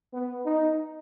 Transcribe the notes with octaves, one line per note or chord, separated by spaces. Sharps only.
B3
D#4